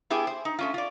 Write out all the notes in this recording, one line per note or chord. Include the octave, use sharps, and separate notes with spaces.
B3 E4 G4 G#4 G#5
C5
D#4
A3 C#4 F4
F4 D5